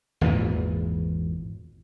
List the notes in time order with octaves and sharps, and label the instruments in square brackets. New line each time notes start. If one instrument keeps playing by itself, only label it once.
[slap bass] G#1 E2 A#2 E3